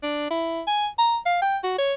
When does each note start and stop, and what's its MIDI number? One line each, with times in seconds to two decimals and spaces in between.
0.03 0.28 62
0.30 0.61 64
0.67 0.87 80
0.98 1.17 82
1.26 1.41 77
1.42 1.57 79
1.63 1.76 66
1.78 1.94 73